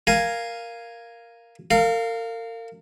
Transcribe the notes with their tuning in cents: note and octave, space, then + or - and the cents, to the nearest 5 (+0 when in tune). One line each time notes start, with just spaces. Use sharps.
A#4 +0 F5 +0 G#5 +0
A#4 -40 F5 +0